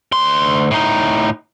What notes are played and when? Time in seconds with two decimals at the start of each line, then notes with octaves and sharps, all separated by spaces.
0.12 D2 C6
0.71 A2 D#4